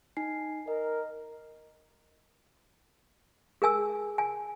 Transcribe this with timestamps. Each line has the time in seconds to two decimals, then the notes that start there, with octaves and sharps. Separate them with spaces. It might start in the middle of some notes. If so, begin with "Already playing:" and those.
0.17 D#4 G#5 C7
0.68 A#4 D#5
3.62 G#4 A#4 G#5 E6
4.18 G#5